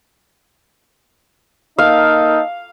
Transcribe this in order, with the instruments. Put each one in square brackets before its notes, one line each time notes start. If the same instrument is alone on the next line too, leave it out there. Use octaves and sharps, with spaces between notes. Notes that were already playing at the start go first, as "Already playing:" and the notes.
[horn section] A#3 D#4 A4 [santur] F5